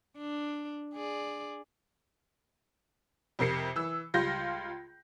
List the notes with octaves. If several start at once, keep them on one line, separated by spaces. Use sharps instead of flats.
D4
G#4 D5
F2 C3 A#4 C7 C#7
E3 E6
C#2 G3 F4 C6 G6 A#6